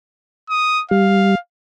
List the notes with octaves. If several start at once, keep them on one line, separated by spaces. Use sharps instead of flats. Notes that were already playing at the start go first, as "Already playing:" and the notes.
D#6
G3 F5